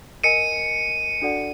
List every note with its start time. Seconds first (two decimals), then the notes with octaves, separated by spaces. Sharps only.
0.24 A#4 D#5 G#5 C#7 D#7
1.21 D4 F#4 A4 D5 F#5